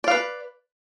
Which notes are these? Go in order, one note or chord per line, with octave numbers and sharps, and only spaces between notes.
B4 D5 F5